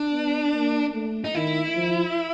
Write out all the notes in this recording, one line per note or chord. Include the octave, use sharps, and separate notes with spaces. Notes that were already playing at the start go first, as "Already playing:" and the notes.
Already playing: D4
B3
A#3
A3
D#4
D#3 E4
F3